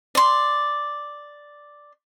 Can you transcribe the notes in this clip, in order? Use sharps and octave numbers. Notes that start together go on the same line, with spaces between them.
D5 C6